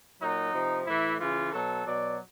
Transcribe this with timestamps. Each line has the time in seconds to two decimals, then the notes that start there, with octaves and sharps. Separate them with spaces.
0.20 A#2 F#3 D#4
0.53 C3 F3
0.86 A2 E3 E4
1.19 C#3 E3 F4
1.52 B2 F#3 A4
1.85 B2 F#3 D5